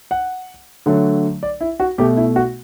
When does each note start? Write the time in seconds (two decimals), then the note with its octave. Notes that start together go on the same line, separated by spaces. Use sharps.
0.11 F#5
0.86 D3 F#3 A3
1.43 D5
1.61 E4
1.80 F#4
1.98 B2 A3 G4
2.17 E4
2.36 F#4